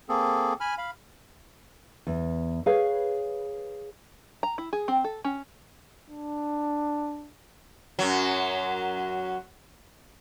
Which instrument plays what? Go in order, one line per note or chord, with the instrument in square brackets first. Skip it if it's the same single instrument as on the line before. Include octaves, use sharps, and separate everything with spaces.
[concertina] A#3 C4 G#4 A4
G#5 B5 F6
F5 B5
[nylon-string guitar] E2
G#4 B4 C#5 F5
[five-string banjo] A#5
E4
G#4
C4
A4
C#4
[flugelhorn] D4
[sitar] F#2 F#3